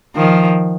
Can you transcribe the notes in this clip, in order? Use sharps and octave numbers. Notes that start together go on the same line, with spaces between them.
D#3 F3